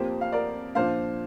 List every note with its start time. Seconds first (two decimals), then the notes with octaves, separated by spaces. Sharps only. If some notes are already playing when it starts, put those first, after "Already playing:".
Already playing: F2 F3 A#3 G4 C5
0.21 F5
0.32 A#4 D5
0.75 A#2 F3 D4 C5 F5